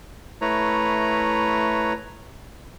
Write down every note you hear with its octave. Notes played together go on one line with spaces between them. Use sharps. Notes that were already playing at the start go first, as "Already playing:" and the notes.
A3 E4 B4 C#5 A#5